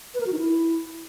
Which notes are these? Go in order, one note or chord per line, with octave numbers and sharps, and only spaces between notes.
B4
A#4
F#4
D#4
E4